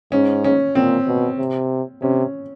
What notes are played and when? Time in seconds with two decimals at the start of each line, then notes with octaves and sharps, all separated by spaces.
0.12 G#2 C#4
0.44 C#4
0.75 A#2 C4
1.07 B2
1.38 C3
2.02 C3 C#4